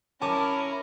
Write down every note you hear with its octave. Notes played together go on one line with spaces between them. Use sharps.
C#4 E4 A#4 A5 D6